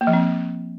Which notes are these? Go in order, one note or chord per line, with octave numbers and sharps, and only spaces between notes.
A#3
F3
C4